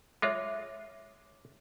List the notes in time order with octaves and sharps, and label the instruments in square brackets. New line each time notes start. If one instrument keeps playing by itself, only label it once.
[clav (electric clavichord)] G#3 F4 [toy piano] C#5 E5 D6